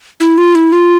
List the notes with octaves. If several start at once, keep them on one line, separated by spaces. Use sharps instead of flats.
E4
F4
E4
F4